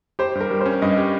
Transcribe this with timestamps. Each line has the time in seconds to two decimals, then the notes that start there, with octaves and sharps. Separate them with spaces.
0.19 G4 C5
0.35 G2
0.41 A#4
0.51 G3
0.61 C5
0.66 C#4
0.82 G2 D#5
0.98 G4